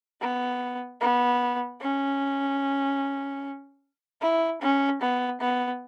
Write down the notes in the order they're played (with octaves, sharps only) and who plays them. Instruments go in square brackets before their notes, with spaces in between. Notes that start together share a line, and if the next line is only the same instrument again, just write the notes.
[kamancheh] B3
B3
C#4
E4
C#4
B3
B3